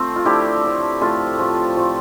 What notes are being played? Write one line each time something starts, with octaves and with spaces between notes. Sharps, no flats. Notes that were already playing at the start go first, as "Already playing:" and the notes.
Already playing: F3 A3 C4
F4
D3 F3 A3 E4 G4
A2 F3 A3
A2 F3 A3 F4 A4
A2 F3 A3
A2 F3 A3